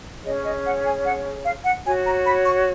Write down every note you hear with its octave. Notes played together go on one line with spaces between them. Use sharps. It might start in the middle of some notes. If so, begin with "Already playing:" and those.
C#4 G#4 C#5 D#5
D#5
F#5
G#5
F#5
F5
F#5
F#4 C#5 G#5
A#5
B5
C#6